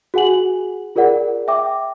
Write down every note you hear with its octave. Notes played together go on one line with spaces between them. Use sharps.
F#4 G#4 F#5 G#5 F#7
F4 G#4 A#4 D5 F#5
E5 G5 D6